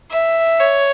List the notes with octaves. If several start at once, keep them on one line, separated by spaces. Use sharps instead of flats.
E5
C#5